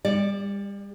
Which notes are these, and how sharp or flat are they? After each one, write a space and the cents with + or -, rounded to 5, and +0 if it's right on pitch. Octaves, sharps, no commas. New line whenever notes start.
G3 +35 D5 +0